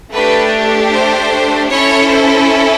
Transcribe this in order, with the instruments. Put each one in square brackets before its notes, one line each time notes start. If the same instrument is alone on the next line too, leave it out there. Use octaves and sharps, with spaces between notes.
[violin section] A3 D4 G4 B4
C5
C#4 E4 A4 C#5
C5